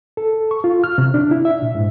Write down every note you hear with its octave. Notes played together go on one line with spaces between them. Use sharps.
A4
C#6
F4
F6
C3
D4
E4
E5
A#2
G#2